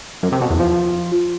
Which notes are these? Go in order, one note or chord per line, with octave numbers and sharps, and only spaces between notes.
F#2
C3
B2
E2
F3